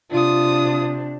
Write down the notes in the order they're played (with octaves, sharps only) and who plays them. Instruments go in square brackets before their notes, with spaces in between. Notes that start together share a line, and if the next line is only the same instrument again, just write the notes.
[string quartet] C3 D4 [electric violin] F4 D#6